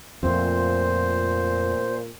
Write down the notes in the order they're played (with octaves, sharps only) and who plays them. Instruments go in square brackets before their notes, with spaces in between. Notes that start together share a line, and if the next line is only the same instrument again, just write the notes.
[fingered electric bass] F2 [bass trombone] A#2 [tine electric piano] A3 C4 F4 [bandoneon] C5